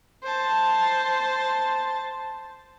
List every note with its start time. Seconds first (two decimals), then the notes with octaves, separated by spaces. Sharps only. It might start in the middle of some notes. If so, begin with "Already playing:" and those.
0.23 C5 A5